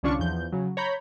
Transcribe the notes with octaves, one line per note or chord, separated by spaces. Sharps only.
C2 D3 C#4 D4 F4 C#6
E2 F3 G6
C#3 F#3
C#5 A#5 B5 G6